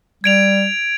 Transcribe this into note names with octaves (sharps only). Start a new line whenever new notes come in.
G3 G#6 D7 F7